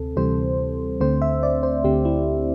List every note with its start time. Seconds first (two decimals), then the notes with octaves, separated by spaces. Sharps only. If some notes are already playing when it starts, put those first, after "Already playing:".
Already playing: D2 C3 C4 A4
0.16 D2 C3 E3 G3 C4 C5
1.00 D2 D3 A3 C4 C5
1.22 E5
1.43 D5
1.63 C5
1.84 D2 D3 A3 C4 G4
2.05 E4